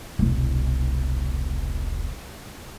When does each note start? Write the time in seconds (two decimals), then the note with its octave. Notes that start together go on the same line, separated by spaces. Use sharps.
0.19 E1 C2